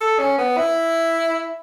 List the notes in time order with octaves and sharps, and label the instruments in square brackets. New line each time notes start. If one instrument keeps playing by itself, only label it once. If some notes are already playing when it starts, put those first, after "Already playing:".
[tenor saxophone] A4
C#4
B3
E4